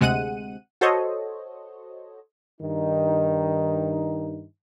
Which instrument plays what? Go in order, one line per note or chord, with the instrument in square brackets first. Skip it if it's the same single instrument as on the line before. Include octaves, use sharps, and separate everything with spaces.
[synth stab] D2 C3 G#3 F#5 F#6 D#7
F#4 A4 C5 C#5 D#5
[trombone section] G2 D#3 D#4